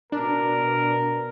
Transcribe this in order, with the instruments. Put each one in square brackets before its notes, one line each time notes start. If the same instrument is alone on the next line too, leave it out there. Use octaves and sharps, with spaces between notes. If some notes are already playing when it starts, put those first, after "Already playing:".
[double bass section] B2 [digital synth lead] D4 [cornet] A#4